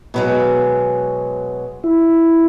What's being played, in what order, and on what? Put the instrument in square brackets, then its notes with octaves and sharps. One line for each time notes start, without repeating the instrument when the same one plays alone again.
[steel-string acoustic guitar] B2 F#3 G#3
[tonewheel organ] E4